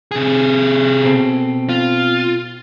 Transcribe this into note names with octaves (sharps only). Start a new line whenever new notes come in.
C3 G#4
B2 C4 A4
F4